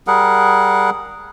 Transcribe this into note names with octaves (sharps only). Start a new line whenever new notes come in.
G3 G#4 A#4 F#5